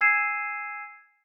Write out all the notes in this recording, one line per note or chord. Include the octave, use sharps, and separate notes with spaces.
G#5 E6 G#6 C7 D#7 E7